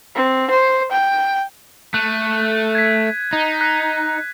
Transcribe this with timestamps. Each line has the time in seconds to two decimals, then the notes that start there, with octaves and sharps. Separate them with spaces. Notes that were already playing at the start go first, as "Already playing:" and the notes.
0.15 C4
0.50 C5
0.92 G5
1.94 A3 F#6 D#7
2.75 G#6 B6
3.33 D#4
3.61 F#6 B6